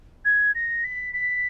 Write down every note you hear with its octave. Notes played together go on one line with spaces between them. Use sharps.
G#6
A#6
B6
B6